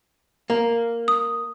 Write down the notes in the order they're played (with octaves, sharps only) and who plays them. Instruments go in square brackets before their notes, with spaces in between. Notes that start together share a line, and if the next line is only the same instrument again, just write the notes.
[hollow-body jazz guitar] A#3
[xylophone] D#6